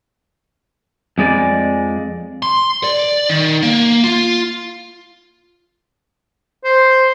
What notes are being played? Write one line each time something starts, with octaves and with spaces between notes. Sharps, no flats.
F2 G#3 D5
C6
D5
D#3
A#3
F4
C5